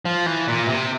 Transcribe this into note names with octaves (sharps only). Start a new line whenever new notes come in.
F3
E3
A#2
C3